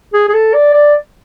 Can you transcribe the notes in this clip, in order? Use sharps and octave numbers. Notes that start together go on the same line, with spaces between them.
G#4
G#4
A4
D5
D5